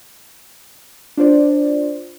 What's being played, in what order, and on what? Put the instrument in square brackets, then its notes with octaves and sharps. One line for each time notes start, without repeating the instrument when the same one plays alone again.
[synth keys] D4 F4 C5 D5